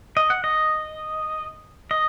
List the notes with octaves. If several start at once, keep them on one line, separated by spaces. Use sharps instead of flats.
D#5
F#5
D#5
D#5